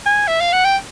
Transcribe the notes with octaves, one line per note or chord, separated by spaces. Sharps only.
G#5
E5
F5
F#5
G5